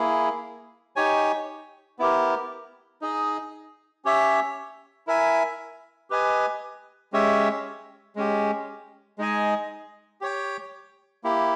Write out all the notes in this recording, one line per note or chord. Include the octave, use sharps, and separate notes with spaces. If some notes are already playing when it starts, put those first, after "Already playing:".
Already playing: A#3 E4 G#4
D#4 G4 C#5 G#5
B3 E4 G4 A#4
D#4 G#4 D#5
C#4 G4 C#5 E5
E4 A#4 E5 G#5
G4 B4 D#5 G#5
G#3 C#4 G4 C#5 E5
G#3 C#4 G4
G#3 D#4 G#4 D#5 G#5
G4 C#5 G5
A#3 E4 G4